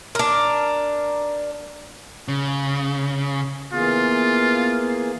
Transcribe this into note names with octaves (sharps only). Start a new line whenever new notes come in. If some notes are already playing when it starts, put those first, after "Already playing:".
D4 A#4
C#3
E3 A#3 B3 F4 G#4